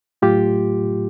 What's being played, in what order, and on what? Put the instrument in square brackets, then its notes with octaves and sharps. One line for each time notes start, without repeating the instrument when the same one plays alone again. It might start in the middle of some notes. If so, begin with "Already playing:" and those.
[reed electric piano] A2 F#3 A3 F4 G4